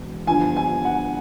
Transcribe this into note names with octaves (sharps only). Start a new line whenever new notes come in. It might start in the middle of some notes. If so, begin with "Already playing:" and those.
Already playing: E1 E2
G1 G2 D3 F3 G#5
G#5
F#5